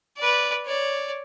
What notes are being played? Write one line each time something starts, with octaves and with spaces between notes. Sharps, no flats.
B4 D5
C#5 D5